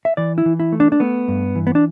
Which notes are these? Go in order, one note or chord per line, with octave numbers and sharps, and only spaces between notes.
E5
E3 D5
E4
E3
E4
A3
D4
D4
A3 B3
G2
E3
B3
D4